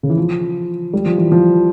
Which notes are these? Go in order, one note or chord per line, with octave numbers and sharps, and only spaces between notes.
C#3
E3
F3
G3
F3
E3
F3